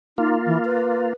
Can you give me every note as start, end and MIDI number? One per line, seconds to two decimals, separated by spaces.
0.18 1.13 58
0.18 0.35 63
0.18 1.13 65
0.46 0.58 52
0.65 1.13 71